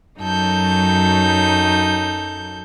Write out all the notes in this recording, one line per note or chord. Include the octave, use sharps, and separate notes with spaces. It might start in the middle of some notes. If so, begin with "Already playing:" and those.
F#2 F#3 D#4 A4 G6